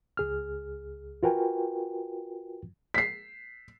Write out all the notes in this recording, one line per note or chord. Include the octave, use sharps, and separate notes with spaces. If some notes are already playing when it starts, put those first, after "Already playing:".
C#2 G#4 F6
F4 F#4 A#4 B4 G5 G#5
B6 C7